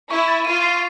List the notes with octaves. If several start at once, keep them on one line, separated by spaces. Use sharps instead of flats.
E4 C#6
A6
F4 D#7
C7